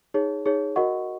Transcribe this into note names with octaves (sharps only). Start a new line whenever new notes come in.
D#4 G#4 C#5
D#4 G#4 C#5
F#4 A#4 D#5 F#5 C#6